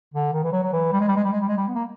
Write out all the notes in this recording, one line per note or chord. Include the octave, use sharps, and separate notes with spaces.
D3
D#3
E3
F#3
F#3
E3
G3
G#3
G3
G#3
G3
G#3
G3
G#3
G3
B3
A#3